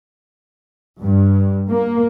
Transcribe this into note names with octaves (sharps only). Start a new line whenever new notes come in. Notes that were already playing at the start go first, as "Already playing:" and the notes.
G2
A#3